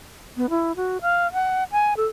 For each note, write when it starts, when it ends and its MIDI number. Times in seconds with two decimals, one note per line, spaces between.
0.37 0.50 59
0.50 0.75 64
0.76 0.98 66
1.02 1.31 77
1.33 1.64 78
1.72 1.94 80
1.97 2.07 69